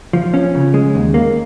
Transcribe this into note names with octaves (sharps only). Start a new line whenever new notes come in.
F3
C#4
C#3
G#3
D#2
A#3